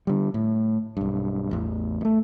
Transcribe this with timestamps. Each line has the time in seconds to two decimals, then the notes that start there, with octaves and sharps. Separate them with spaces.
0.07 D3 G3
0.34 A2
0.97 B1 G2
1.51 A1 E2
2.01 G2 A3